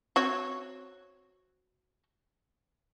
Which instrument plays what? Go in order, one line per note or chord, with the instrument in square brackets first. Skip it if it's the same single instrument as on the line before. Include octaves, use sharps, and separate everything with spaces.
[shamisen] C4 F#4 C#5